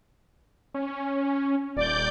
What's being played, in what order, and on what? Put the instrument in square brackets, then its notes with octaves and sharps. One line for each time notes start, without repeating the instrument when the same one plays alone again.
[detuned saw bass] C#4
[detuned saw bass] D#1 [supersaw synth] D5 D6 G6